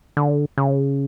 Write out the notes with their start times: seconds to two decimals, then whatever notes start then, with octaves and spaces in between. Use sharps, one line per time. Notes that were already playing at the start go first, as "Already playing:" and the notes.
0.17 D3
0.58 C#3